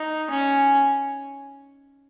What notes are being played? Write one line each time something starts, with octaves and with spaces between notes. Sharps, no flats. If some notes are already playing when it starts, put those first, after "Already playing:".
Already playing: D#4
C#4